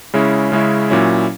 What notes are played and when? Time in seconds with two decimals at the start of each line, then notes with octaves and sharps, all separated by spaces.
0.14 C#3 G#3 C#4 E4
0.52 C#3 G#3 C#4 E4
0.90 A#2 F#3 C#4 E4